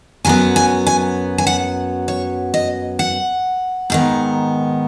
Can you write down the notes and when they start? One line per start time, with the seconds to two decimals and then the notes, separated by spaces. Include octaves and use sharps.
0.25 F#2 F#3 B3 G#5
0.56 G#5
0.87 G#5
1.38 G#5
1.47 F#5
2.08 C#5
2.54 D#5
2.99 F#5
3.90 G#2 D#3 B3